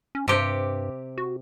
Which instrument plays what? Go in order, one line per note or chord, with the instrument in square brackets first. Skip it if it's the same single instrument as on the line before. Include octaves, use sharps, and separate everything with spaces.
[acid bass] C#4
[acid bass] G2 [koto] C3 G4
[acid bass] F#4